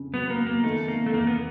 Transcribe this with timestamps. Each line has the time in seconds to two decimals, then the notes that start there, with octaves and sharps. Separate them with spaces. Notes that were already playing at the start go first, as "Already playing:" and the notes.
Already playing: F2 C#3
0.14 F#3 B3
0.30 A#3
0.39 B3
0.47 A#3
0.64 D#3 A3
0.88 C3 A#3
1.06 A3
1.14 E2 A#3
1.27 B3